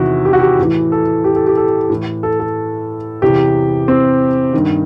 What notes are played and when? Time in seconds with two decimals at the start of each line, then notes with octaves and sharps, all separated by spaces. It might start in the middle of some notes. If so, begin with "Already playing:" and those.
Already playing: E2 C3 D#3 E4 F#4
0.25 G4
0.33 F#4
0.40 G4
0.58 A2 E3
0.92 A4
1.24 G4
1.36 A4
1.47 G4
1.57 A4
1.90 A2 E3
2.23 A4
2.40 A4
3.22 E2 C3 E3 G4
3.88 C4
4.53 G2 D#3